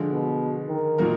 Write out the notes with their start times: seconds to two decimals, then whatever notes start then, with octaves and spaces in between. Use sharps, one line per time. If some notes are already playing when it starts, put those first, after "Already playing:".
Already playing: D3 F3 G#3
0.12 B2
0.69 D#3
0.98 A#2 F#3 A#3 D#4 A#4